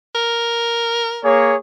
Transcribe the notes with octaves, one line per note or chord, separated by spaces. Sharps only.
A#4
A#3 G#4 C#5